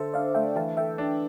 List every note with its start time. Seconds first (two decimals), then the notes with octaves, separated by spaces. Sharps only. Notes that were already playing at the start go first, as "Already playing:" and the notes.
Already playing: D3 A4 C5 E5
0.14 D4 D5 F5
0.35 A3 E5 G5
0.56 E3 F5 A5
0.77 A4 E5 G5
0.98 D4